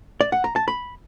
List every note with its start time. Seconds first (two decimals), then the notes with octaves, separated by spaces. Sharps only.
0.21 D5
0.32 F#5
0.44 A#5
0.56 A5
0.68 B5